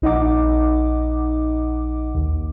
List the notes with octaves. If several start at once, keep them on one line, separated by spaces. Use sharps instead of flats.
A#1 D#4 D#5 F#5 D6
D#2